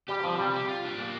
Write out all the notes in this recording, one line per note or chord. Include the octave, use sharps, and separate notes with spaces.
G3 G4
F3 C4
C3 G3
G4
F4
D4
A#3